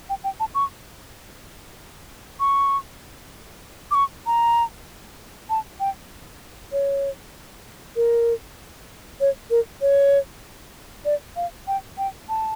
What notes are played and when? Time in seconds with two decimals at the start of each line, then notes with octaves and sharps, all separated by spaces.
0.10 G5
0.24 G5
0.40 A5
0.55 C#6
2.40 C#6
3.91 D6
3.95 C#6
4.26 A#5
5.50 A5
5.80 G5
6.72 C#5
7.96 A#4
9.21 C#5
9.50 A#4
9.81 C#5
11.05 D5
11.36 F5
11.68 G5
11.98 G5
12.29 A5